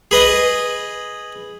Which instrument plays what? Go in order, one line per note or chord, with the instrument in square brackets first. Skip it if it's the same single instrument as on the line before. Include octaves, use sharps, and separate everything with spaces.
[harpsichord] G#4 B4 D#5